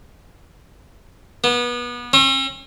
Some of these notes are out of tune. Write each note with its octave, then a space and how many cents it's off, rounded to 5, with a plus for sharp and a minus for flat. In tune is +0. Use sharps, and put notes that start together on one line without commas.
B3 -30
C#4 -45